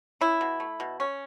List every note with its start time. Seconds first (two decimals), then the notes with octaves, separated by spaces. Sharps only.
0.21 C#4 E4
0.41 B2
0.60 A3
0.80 B2
1.00 C#4